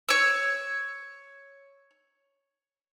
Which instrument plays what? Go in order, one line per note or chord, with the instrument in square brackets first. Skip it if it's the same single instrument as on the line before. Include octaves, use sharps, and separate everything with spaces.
[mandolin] C#5 E6